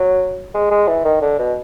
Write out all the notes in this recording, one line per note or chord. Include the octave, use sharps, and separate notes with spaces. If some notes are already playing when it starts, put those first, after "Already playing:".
Already playing: F#3
G#3
G#3
E3
D#3
D3
B2